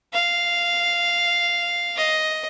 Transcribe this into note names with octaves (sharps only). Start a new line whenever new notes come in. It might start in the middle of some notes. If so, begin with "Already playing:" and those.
F5
D#5